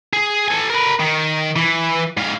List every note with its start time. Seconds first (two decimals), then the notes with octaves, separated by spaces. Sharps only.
0.13 G#4
0.48 A4 G#5
0.70 A#4 B4
1.00 D#3
1.56 E3
2.17 G#2 F5